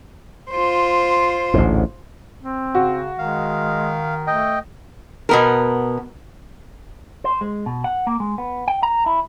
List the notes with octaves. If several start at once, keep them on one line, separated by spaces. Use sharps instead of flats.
F4 C5
A1 D2 G#2
C4
C#3 F#4
D#3 G#3 F5
A3 D#5 G5
B2 B3 A#4
C5
G#3
B2
F#5
A#3
G#3
B3
G5
A#5
E4